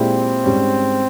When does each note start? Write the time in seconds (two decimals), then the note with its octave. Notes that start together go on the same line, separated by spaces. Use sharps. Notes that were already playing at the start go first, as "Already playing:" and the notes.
Already playing: A#2 G#3 C4 E4 G4
0.44 G#2 G3 C#4